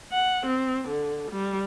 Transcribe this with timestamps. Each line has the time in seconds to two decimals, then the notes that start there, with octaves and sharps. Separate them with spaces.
0.12 F#5
0.46 C4
0.88 D3
1.30 G3